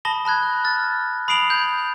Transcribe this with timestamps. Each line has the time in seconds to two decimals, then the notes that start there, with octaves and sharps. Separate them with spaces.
0.05 A5 B5 D#6 A#6 G7
0.25 A5 B5 F#6 G#6
0.64 F6 A6
1.28 B5 D#6 C7 D7 F7 F#7
1.50 G6 G#6